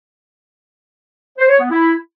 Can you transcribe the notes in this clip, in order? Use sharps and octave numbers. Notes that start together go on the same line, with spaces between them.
C5
C#5
B3
E4